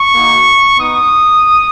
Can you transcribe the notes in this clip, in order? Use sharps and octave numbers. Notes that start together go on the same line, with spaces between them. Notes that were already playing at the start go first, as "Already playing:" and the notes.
Already playing: C#6
A#3 D#4 F#4
B3 D#4 D#6